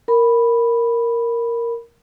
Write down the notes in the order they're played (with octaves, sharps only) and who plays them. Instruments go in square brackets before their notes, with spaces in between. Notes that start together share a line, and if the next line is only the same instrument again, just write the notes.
[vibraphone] A#4 B5